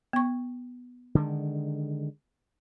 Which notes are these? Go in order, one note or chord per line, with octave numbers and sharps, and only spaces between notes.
B3 C#6
D3 D#3 G#3